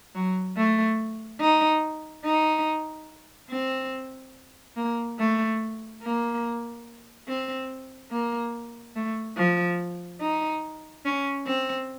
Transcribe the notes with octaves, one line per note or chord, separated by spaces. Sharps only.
F#3
A3
D#4
D#4
C4
A#3
A3
A#3
C4
A#3
A3
F3
D#4
C#4
C4